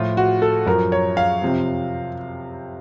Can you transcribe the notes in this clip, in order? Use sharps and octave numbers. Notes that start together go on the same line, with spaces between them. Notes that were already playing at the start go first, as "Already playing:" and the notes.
Already playing: A2 F3 F4
F#4
A4
F#2 F3 A#4
C#5
F5
F2 C3 F3